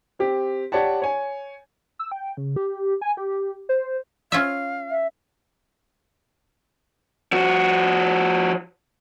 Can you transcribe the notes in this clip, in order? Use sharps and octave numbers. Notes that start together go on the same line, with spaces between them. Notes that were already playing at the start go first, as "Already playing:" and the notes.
C4 G4
G4 C#5 D5 F#5 A5
C#5 G#5
E6
G5
C#3
G4
G#5
G4
C5
C#4 F4 E5 F5
E5
F3 F#4